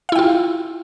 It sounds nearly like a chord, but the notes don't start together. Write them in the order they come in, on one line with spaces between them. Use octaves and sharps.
F5 E4 G5 F4